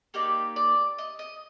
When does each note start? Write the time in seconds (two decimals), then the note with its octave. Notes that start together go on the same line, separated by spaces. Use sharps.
0.14 A#3 D#4 G4 D5
0.56 D5
0.98 D#5
1.19 D#5